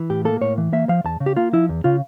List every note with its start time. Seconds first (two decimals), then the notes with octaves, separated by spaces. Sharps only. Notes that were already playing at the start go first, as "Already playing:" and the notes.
Already playing: E3
0.10 A2 G4
0.25 A#3 A4
0.41 A2 C#5
0.58 E3
0.73 A#3 E5
0.89 F3 F5
1.04 E2 A5
1.20 C#3
1.26 G4
1.36 A#3 F4
1.53 F3 E4
1.69 E2
1.84 C#3 F4